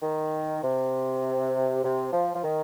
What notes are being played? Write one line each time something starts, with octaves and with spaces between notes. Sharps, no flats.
D#3
C3
C3
F3
F3
D#3